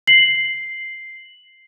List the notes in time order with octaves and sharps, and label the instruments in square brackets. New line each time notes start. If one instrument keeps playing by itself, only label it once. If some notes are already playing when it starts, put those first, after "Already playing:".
[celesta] C7 F#7